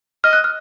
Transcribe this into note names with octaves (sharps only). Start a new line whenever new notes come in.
D#5 F6
F#6
F6